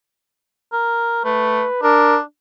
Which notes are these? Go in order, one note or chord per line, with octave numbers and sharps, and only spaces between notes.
A#4
A3 B4
D4 A#4